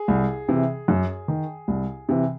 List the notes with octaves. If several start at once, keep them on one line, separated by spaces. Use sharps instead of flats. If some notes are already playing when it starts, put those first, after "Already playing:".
Already playing: G#4
C2
C3 E3
F#2
D#3
C2
C3 E3